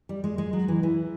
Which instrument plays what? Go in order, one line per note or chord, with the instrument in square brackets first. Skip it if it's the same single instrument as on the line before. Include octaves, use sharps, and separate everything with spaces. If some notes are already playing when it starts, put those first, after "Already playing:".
[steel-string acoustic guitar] G3
G#3
G#3
F#3
E3
E3